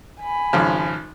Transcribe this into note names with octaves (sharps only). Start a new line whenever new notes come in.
G#5 B5
G#1 F2 C#3